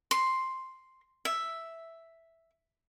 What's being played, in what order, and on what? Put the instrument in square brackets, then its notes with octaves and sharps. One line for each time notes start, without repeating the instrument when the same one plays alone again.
[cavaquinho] C6
E5